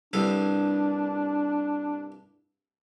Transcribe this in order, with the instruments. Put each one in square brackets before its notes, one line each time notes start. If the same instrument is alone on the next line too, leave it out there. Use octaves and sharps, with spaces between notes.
[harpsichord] C2 G2 A4 [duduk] D4